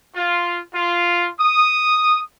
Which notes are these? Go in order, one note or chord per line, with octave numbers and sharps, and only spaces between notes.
F4
F4
D#6